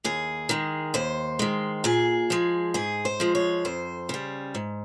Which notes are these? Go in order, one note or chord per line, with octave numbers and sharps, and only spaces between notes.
D#2 G#4
D#3 G#3
D#2 C5
D#3 G#3
A#2 G#4
F3 G#3
G#2 G#4
C5
F3 G#3
C#5
F2 C5
C#3 G3
G#2